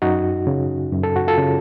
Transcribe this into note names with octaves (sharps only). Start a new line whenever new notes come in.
F#2 D#4 F#4
C#3
F#2
A4
F#4
F4 A4
C#3